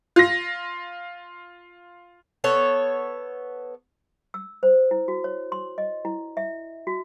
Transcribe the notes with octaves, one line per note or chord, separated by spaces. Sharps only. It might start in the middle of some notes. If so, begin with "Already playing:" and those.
F4 A#6
B3 A4 C#5
E6
C5
E4
F#4
C#5
C6
D#5
E4
E5
F#4